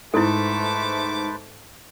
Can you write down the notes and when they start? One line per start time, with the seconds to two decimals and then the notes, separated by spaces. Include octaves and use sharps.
0.14 G#2 A3 E4 A4 B4 C5 A5 D6